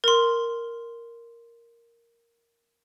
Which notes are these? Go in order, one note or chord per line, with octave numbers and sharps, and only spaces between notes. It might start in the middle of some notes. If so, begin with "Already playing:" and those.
A#4 C6